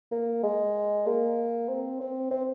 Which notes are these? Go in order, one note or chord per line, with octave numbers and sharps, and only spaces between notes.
A#3
G#3
A#3
C4
C4
C4